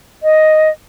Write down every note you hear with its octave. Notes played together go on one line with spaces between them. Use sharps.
D#5